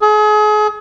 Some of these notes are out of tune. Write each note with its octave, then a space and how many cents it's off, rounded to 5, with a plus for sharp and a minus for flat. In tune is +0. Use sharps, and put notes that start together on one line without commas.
G#4 +35